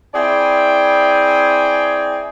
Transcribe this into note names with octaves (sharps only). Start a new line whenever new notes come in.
C4 E4 G#4 D5 G5 G#5